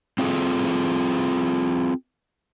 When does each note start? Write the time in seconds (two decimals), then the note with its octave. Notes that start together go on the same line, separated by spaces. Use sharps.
0.18 C4 F4 F#4 G#4 A4